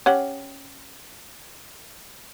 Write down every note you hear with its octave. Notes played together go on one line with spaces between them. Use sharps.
C#4 G4 F#5